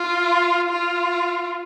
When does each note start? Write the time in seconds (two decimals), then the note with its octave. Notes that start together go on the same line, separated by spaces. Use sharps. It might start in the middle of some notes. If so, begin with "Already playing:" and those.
Already playing: F4
0.70 F4